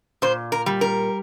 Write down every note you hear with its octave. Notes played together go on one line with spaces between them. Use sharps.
A#2 C5
A#4
G3
A#4